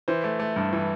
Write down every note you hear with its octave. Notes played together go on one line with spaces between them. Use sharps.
E3 C5
A3
A3
G2
E3